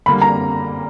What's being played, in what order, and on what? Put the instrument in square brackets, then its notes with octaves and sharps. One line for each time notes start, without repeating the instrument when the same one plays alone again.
[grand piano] D3 G3 A#3 [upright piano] B5
[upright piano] A#5